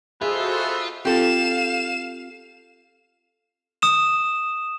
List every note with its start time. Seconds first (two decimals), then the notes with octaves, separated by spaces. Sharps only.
0.21 B3 F4 F#4 G#4 A4 C5 D#5 E5
1.05 C4 F4 G4 A4 F5 E7
3.82 D#6 E7